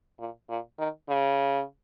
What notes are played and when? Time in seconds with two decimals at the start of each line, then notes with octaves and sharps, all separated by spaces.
0.19 A#2
0.49 A#2
0.79 D#3
1.09 C#3